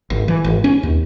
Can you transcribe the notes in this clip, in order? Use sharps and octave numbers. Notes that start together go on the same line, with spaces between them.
G#1
E3
G#1
C#4
D#2